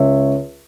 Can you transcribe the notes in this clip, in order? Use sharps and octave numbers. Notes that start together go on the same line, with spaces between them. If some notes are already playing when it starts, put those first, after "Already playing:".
Already playing: C#2 C#5 E5